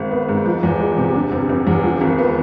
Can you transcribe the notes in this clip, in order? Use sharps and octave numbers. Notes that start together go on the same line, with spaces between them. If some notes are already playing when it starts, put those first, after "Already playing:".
Already playing: G#1 G#3
B3
G#2
F3
E2
G#3
C3
D3
F1
F1
E2
F3
G#1
B3